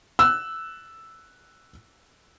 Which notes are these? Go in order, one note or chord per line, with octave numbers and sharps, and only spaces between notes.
E6 F#6